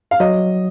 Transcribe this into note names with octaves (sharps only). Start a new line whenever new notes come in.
F5
F#3 D#5